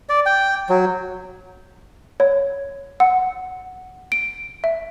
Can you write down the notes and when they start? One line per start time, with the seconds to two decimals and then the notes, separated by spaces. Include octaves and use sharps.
0.09 D5
0.26 G5
0.69 F#3
2.20 C#5
3.00 F#5
4.12 D7
4.64 E5